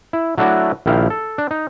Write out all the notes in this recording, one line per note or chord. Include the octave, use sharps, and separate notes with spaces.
E4
F#3 A3 D4 E4 F#4 D5
A#1 D#3 E4 G4 F5
A4
D4
D#4